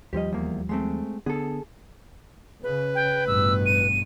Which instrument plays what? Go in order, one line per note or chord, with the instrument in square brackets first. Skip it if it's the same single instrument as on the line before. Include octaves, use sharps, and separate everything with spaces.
[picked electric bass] D#2 F3 G3 [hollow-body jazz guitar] G4 D#5
[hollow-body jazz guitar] E2 A#3
G#3 A3 C4
[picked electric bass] D3 B3 [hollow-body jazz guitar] G#4 A4
[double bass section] C#3 [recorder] B4
[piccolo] G5
[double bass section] A1 G2 B2 [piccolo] E6
[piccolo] D#7